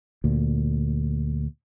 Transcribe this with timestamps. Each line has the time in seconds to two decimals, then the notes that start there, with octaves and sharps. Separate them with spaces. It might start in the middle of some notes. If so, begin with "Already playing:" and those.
0.24 D2 A#2